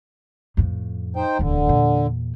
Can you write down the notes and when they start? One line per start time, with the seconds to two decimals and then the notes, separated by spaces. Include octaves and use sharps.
0.57 F2 A2
1.16 D#4 C5 G5
1.39 D1 E2 D3
1.67 E2 A#2